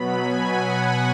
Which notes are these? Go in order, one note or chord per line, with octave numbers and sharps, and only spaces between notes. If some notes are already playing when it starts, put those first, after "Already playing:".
Already playing: B2 F#3 B3 B5
G#5
F#5